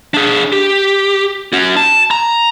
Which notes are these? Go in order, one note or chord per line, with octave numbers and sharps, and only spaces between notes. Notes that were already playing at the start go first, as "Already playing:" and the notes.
D4 G#4
G4
C#4 F#4
A5
A#5